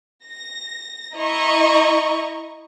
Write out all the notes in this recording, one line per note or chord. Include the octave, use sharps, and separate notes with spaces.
A#6
E4 D#5 A#5 C#6